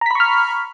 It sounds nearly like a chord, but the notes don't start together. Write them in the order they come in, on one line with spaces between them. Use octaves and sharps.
A#5 B6 B5 C#6 F6